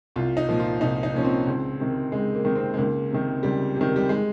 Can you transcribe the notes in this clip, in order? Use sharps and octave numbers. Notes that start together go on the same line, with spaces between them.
C2 F4
D#4
A#2 F3
F4
C2 D#4
D#4
A#2 F3 C#4
C4
C#2
C3 D#3
C#2 G#3
A#3
C3 D#3
C4
G#3
C#2 A#3
C3 D#3
C#2 G3
C3 D#3
G3
G#3